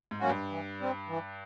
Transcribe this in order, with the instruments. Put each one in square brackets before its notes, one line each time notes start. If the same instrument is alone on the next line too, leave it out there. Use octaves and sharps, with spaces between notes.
[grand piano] G#2
[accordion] F#3 A#3 C#4 F#4
[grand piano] G2
[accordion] E3
G3 C4
E3